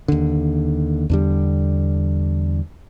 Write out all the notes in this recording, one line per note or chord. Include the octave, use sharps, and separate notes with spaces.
D#2 D3
E2 D3 G3